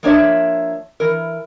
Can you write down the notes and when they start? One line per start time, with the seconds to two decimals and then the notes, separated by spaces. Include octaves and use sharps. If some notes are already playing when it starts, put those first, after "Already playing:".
0.03 F3 A#3 D4 C#5 E5
1.00 E3 A#4